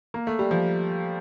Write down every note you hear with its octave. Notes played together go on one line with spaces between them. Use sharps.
A#3
A3
G3
F3